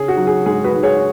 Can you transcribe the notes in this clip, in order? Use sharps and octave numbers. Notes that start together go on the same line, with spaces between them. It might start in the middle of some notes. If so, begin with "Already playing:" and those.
Already playing: C#3 C#4 G#4
F#4
F#3
G#4
G#2 G#4
F#4 B4
G#2
G#4 C#5